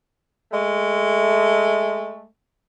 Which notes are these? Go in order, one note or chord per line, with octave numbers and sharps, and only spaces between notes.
G#3 A3